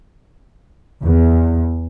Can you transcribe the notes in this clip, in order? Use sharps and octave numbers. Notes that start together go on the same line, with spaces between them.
E2